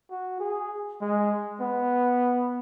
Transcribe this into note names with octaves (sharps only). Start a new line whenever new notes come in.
F#4
G#4
G#3
B3